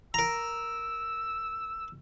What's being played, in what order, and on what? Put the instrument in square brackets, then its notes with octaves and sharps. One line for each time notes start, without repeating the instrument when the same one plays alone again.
[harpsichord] A#4 A#5 [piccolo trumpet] E6